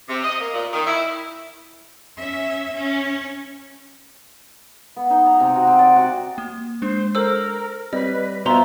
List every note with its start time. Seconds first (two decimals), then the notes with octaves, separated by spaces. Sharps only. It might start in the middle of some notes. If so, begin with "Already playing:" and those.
0.09 C3
0.24 D#5
0.40 A#3
0.54 A#2
0.72 D#3
0.87 E4
2.17 C#4 E5
2.73 C#4
4.96 B3
5.10 D#4
5.26 A#5
5.40 C3
5.55 F#4
5.67 C4
5.79 D5
5.96 F#4
6.38 A#3
6.82 G#3 D4 C5
7.15 A4 A#4 C5 E6
7.93 G3 C4 B4 C#5 D#5
8.46 B2 F4 C5 E5 A#5 C6